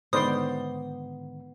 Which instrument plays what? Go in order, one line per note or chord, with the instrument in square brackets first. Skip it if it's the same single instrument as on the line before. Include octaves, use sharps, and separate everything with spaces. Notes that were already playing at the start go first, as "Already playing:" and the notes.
[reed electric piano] G#2 D3 D#3 [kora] B3 [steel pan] C5 D5 C6 [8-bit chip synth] D#6